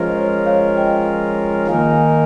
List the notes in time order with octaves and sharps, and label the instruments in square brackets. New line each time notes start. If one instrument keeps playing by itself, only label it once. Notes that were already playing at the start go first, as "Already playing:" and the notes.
Already playing: [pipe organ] F3 G#3 C#4 F4 A#4 [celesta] C5 D#5
[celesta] C#5
C#5 F5
D#5 G5
[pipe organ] D#3 A#3 D#4 A#4 [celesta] F5 G#5
[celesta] F5 G#5